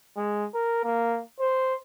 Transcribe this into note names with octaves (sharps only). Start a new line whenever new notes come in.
G#3
A#4
A#3
C5